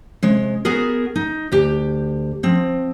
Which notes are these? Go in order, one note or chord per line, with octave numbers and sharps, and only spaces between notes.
C3 G#3
B3 F#4 G#4 A#4
D#4
D2 G4
F3 C4